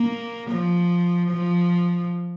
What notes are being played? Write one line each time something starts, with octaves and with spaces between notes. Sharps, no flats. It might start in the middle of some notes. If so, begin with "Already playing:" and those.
Already playing: A#3
F3
F3